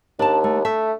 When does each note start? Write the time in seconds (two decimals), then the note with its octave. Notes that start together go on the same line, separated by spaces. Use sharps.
0.19 D#2 D4 A5
0.44 A3
0.65 A3 E5